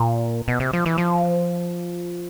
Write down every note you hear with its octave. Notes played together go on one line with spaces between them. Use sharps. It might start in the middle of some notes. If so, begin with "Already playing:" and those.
Already playing: A#2
B2
C3
F3
E3
F3